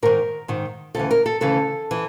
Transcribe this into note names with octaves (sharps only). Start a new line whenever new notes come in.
G#2 D#3 A#4
G#2 D#3
D2 C#3 E3 A4
A#4
A4
D2 C#3 E3 A4
E3